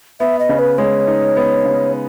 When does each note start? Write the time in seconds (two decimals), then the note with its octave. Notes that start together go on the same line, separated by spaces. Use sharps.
0.20 B3 E5
0.39 D#5
0.49 C#3
0.59 B4
0.78 G#3 C#5
1.07 D#4
1.37 B3
1.65 C#3